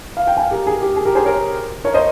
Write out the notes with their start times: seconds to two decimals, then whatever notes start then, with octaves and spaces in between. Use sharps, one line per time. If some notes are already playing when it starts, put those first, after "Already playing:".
0.17 F5
0.27 G5
0.37 F5 G#5
0.51 G4 A#4
0.67 G#4
0.82 G4
0.96 G#4
1.05 G4 A#4
1.15 G#4 C5
1.25 A#4 C#5
1.84 A#4 C#5
1.94 C5 D#5